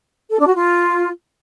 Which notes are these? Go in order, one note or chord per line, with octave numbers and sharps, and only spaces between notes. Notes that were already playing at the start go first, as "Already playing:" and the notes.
A4
D4
F#4
F4